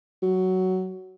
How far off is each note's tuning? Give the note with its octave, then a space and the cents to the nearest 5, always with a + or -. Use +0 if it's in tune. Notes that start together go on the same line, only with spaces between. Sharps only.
F#3 +10